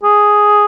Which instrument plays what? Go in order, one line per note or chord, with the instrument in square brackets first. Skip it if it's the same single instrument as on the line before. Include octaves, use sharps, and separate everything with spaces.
[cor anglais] G#4